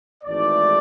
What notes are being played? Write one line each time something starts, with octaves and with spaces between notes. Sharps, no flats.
G#1 G#2 E3 A3 D5